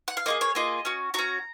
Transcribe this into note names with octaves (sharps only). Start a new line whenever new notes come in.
F#5
F5
A#3 F4 G#4 D#5
C#5
A#3 F4 G#4 D#5
C#4 F#4
C#4 F#4 A#5